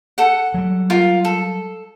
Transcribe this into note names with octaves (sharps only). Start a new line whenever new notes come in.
A4 F#5
F#3 G3
F4 A#4
A4